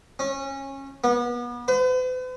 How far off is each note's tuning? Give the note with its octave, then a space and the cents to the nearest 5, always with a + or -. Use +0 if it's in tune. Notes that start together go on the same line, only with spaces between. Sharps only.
C#4 -20
B3 -35
B4 +45